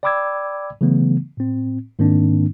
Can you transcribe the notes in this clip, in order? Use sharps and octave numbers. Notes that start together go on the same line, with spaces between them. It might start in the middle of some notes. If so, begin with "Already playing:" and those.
D5 G5 B5 D6 E6 G#6
C#3 E3 F#3 A3 B3
A2 C4
G#2 D#3 A#3 C4 D4